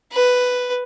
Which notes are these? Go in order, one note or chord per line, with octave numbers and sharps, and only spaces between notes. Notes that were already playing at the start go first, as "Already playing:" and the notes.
B4